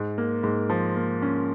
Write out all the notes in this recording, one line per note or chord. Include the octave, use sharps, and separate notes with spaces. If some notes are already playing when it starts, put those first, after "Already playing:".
Already playing: G#2
A#3
G#2
F3
A#3
C#4